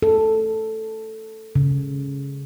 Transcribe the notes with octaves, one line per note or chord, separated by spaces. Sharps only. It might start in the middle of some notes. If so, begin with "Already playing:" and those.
A4
C#3